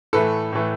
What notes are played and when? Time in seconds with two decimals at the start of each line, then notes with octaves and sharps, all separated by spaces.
0.13 A2 E3 A3 A4 B4
0.53 A2 E3 A3